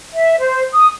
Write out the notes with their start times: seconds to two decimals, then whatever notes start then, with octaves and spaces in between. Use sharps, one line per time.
0.12 E5
0.39 C5
0.72 D#6